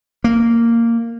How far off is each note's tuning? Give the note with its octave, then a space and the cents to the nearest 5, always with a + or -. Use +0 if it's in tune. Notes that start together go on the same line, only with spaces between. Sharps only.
A#3 -10